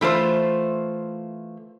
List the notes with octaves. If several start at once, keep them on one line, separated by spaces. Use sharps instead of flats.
E3 A3 F4 C5